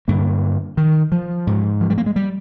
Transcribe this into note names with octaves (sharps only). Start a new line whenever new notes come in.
G2 D3 A#3
D#3
F3
G#2
F3
G3
A#3
G#3
G3